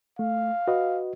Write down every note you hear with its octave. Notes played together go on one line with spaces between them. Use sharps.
A3 F5
F#4 B4 D#5